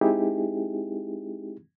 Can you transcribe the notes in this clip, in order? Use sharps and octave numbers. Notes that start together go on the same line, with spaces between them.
G#3 C4 D#4 E4 G4 G#4